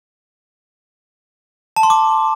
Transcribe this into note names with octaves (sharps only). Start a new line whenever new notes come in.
A5
C6
D6